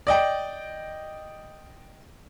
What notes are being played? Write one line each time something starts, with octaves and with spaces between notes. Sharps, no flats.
D5 D#5 G5